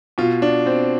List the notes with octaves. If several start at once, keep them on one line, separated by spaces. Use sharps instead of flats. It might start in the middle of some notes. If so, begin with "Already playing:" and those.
B2 F4
D4
C4